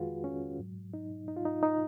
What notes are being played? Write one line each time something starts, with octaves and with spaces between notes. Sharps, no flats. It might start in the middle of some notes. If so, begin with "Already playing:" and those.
Already playing: F2 D#3 G#3 F4 F#4 G#4 B4
C#4
G#2 F#3
D#4
D#4
F4
D#4
D#4